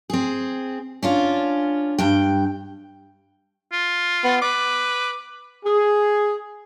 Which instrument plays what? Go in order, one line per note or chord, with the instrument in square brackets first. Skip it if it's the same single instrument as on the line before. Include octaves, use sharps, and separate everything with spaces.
[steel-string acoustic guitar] C4 G#4
C#4 D4 F4
G2 G5
[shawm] F4
[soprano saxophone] B3
[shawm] B4 [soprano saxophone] D6
[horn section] G#4